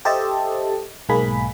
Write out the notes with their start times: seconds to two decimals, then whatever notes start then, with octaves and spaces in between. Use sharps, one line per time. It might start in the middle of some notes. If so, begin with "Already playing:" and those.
0.05 G4 A4 C5 D#5 E5 A5
1.09 B1 G#2 G#3 A#3 G#4 B5